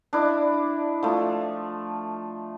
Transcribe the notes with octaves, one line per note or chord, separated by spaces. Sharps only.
D4 E4 D#5
F3 A3